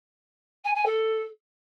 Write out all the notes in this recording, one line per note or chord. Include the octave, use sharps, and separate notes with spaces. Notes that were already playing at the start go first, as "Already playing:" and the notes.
G#5
G#5
A4